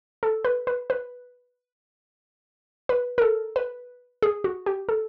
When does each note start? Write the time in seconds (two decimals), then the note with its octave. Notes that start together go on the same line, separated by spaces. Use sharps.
0.23 A4
0.45 B4
0.67 B4
0.90 B4
2.89 B4
3.18 A#4
3.22 A4
3.56 B4
4.22 G#4
4.44 F#4
4.66 G4
4.89 A4